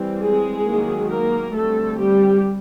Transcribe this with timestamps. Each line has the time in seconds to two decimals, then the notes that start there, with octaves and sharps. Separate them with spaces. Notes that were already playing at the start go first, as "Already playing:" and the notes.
Already playing: E3 G3 C4
0.21 G#3 G#4
0.66 D#3 F#3 A#3
1.10 A#3 A#4
1.55 D3 G3 A3 C4 A4
2.00 G3 G4